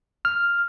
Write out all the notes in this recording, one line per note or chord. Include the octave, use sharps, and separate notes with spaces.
F6